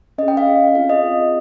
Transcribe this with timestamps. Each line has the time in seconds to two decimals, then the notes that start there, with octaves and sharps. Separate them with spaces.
0.18 C#4 G#4 D#5
0.28 G5
0.37 F5
0.47 C#4 G#4
0.75 C4 F4 G#4 F5
0.89 D#5
1.04 C4 F4 G#4